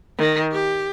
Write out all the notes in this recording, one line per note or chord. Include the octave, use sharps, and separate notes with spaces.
D#3
G4